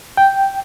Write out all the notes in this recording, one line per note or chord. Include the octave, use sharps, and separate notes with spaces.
G5